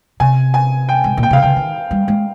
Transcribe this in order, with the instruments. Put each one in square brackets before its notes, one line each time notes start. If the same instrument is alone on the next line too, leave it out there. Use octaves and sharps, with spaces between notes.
[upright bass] C3 [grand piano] G#5
[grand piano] G#5
G5
[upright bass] G#2
A#2
[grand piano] G5
[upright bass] C3 [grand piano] F5
[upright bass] C#3 [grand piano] G5
[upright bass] D#3
G3
G#3